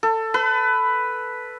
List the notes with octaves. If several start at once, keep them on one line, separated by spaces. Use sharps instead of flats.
A4
B4